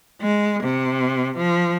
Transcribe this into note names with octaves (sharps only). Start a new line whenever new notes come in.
G#3
C3
F3